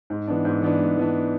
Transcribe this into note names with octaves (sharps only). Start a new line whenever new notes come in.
G#2
E3 B3 D4
G#2
E3 B3 D4
G#2
E3 B3 D4